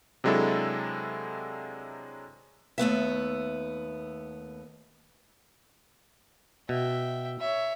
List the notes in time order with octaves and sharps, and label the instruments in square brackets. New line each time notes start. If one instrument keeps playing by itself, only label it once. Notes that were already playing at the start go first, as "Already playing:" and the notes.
[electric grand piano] C3 F#3 G#3 D4 E4 A4
[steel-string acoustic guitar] D#2 A3 B3 E5
[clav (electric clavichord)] B2 [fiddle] E5 G5
[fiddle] C#5 E5